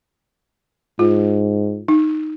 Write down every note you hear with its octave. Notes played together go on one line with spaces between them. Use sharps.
G#2 F4
D#4